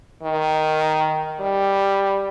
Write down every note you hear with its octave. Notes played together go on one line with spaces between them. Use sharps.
D#3
G3